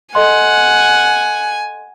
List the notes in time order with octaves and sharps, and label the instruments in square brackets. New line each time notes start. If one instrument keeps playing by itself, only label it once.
[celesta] A4 D#5 C6 [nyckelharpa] F#5 [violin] G#5